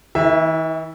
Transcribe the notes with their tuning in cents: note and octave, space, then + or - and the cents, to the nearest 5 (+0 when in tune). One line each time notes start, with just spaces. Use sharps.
E3 -45 E4 +0 E5 +0